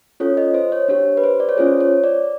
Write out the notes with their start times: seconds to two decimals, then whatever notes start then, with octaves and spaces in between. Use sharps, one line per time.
0.20 C#4 F4 A4 C#5
0.37 D#5
0.54 C5
0.72 C#5
0.88 D4 G4 C#5
1.17 B4
1.24 C5
1.40 D5
1.49 C#5
1.57 C#4 F4 G#4 C5
1.80 C#5
2.04 D5